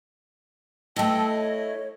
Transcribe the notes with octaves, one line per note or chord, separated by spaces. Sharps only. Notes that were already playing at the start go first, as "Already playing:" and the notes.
A3 E4 D#5 G5 A5 E6
C#5